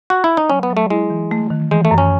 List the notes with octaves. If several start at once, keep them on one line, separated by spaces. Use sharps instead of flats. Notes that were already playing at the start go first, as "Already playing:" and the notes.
F#4
E4
D#4
F#3 C#4
B3
F#3
A3
G#3 E4
E3
A3
D#3
E3 G#3
A3
F#2
C#4